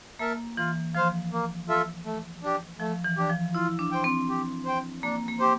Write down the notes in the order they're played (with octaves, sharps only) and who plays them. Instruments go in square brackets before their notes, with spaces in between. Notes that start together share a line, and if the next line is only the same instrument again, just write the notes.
[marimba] A#3 [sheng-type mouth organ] A#4 E5 A5
[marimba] E3 [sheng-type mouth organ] F4
[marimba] F3 [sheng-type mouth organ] C5 F5
[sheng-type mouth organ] A#3
F4 A4 E5
A3
D4 G4
[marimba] F3 [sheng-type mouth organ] A3
[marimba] E3
[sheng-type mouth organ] D4 G4
[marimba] F3
[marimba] E4 [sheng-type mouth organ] F4
[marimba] D4
[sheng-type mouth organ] C5 G5
[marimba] C4
[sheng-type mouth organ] G4
C5 G5
[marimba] A#3 [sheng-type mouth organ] D4
[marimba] A#3
[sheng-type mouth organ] G4 C5